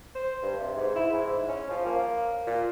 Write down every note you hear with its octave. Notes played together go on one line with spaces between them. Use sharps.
C5
G2
C3
G#2
E4
G#2
C#4
F3
A#3
A#2